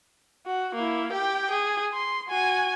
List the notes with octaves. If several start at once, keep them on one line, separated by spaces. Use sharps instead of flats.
F#4
A#3 E4
G4 G5
G#4
C6
F#4 G#5